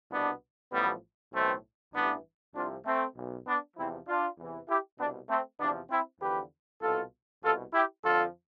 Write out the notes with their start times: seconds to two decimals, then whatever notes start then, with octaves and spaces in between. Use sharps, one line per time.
0.11 C2 B2 B3 D4
0.72 A1 A2 F3 G3 B3
1.33 B1 A2 E3 A3 C4
1.94 A1 G2 E3 B3 D4
2.54 C2 C3 F3 D4 F4
2.85 A3 C4
3.16 B1 B2
3.47 B3 D4
3.76 E2 C3 F3 C4 E4
4.08 D4 F4
4.38 E2 C3 E3
4.68 E4 G4
4.98 C2 B2 B3 D4
5.29 A3 C4
5.59 E2 C3 F3 B3 D4
5.90 C4 E4
6.21 E2 D3 F3 G4 B4
6.82 C2 B2 F4 A4
7.42 C2 B2 F4 A4
7.73 E4 G4
8.04 F2 D3 F3 F4 A4